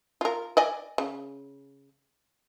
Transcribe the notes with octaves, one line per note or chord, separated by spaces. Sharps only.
F4 A#4
D5 D#5 G#5
C#3